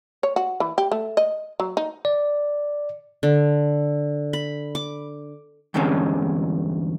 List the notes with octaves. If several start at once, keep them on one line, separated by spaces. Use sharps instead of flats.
C#5
F#4
E3
G4
A3
D#5
F#3
D#4
D5
D3
B5
D6
E2 G2 D3 G#3 C4 C#4